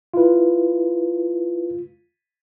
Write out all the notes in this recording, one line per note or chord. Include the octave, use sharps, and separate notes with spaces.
E4 F4 B4